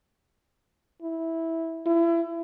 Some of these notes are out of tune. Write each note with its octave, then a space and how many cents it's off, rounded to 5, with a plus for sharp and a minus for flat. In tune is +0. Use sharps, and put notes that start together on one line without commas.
E4 -10
E4 +30